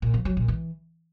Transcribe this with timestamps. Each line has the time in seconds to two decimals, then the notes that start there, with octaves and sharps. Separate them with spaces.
0.02 A#2
0.14 F3
0.25 F#3
0.37 A#2
0.48 E3